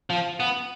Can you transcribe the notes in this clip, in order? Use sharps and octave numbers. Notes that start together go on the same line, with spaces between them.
F3
B3